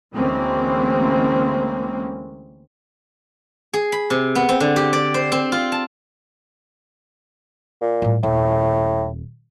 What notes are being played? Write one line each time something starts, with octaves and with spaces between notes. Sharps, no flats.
D2 E3 G#3 A#3 C4 C#4
G#4
B5
C3
B3
C4
D3
G4
D5
C5
C4
F4
A5
A#2
A2 G3
D#1 A2